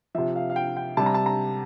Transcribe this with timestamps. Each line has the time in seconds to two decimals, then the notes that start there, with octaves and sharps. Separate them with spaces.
0.15 C3 F3 E5
0.36 F5
0.50 F5
0.56 G5
0.77 G5
0.97 C3 G3 A5
1.06 A#5
1.14 A5
1.26 A#5